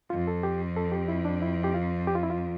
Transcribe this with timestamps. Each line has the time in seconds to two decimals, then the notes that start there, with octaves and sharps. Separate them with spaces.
0.10 F2 F4
0.28 A4
0.43 G4
0.77 A4
0.92 G4
1.08 E4
1.25 D4
1.42 E4
1.64 G4
1.74 F4
2.07 G4
2.15 F4
2.23 E4
2.30 F4